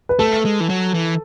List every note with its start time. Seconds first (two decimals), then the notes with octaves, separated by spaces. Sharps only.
0.09 B4
0.19 A3 A4
0.45 G#3
0.60 E3
0.69 F#3
0.94 E3